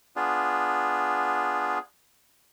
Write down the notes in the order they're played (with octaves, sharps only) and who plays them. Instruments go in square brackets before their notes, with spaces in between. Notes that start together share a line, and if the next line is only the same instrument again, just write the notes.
[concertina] B3 D4 F4 G#4